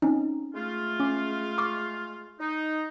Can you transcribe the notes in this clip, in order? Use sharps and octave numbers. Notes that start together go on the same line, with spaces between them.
C4 C#4 D#4
G#3 A3 F4
C#4 D6
C#6 D6 F6
D#4